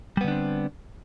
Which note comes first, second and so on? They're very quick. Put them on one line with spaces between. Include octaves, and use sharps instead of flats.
G3 B3 D3 D4 C4